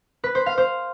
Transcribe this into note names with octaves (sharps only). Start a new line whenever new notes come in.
B4
C5
F5
C5